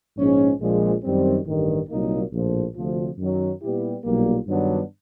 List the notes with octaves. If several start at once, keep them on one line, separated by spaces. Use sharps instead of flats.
A#1 G#2 F3 G#3 C#4
A#1 A#2 F3 G#3
F#2 D#3 G3 C4
A1 G2 D#3
C2 A#2 F#3 A#3 D#4
A#1 A2 F3
D2 C3 F3
F#2 D#3 F#3
A#2 G3 B3 E4 G4
B1 A#2 G3 A#3
G2 D#3 F#3 B3 D4